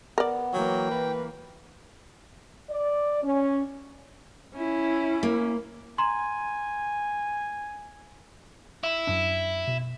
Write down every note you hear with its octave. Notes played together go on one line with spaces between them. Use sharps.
B3 A#4 D5
E3 F#3 A#3 G5
B4
D5
C#4
C#4 E4
A#3
G#5 A#5 C6
E4
F#2 D4
B2